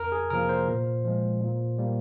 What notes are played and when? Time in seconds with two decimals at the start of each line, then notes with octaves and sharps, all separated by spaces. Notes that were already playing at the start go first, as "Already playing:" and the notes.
Already playing: F2 A#4
0.12 G#4
0.30 C3 F3 A#3 A#4
0.49 C5
0.68 A#2
1.05 F3 G#3
1.40 A#2
1.78 G3 A#3